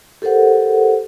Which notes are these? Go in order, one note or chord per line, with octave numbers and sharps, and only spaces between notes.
G4 A4 A#4 C5 F#5